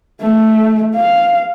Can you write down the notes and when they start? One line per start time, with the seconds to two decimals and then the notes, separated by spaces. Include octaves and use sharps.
0.21 A3
0.95 F5